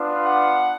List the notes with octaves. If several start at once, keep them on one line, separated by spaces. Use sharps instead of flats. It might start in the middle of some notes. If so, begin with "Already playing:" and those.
Already playing: B3 D4 F4
F#5